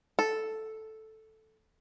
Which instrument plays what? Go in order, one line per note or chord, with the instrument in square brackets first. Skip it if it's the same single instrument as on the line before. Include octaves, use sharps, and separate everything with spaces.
[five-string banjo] A4